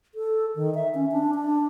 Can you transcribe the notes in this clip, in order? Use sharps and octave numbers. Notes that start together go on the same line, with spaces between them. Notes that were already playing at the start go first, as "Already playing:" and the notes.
A4
D#3
E5
C#4
D4
D4